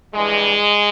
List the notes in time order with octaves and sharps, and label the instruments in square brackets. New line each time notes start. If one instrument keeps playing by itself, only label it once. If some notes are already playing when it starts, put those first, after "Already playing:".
[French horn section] G2 E3 G3 G#3